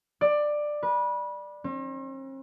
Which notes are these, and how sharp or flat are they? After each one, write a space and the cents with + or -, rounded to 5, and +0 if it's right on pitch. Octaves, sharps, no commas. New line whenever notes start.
D5 +15
B4 -25
C4 +45